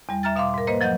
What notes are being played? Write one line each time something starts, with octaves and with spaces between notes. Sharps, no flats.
E2 G3
E5 A#5 F6 A6
B2 E5 F5 C6 D6
G#2 A#4
A#3 B4 C5 D#5
F3 F#3 D#5 F#5 G6